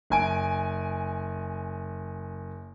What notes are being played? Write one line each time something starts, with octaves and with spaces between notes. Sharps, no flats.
F#1 G#5 D7